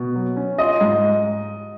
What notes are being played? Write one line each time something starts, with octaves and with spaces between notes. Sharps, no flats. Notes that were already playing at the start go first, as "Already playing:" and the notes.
Already playing: B2
F#3
C#4
F4 D#5
G#2